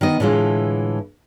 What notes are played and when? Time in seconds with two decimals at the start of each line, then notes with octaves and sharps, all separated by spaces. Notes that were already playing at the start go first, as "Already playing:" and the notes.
0.01 D#3 B3 D#5
0.20 A2 D3 E3 G#3 F4